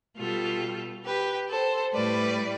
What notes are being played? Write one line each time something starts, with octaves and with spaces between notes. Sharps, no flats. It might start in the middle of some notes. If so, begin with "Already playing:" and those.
B2 G3 F4 A4
G4 B4
A4 C5
A2 G3 B4 D5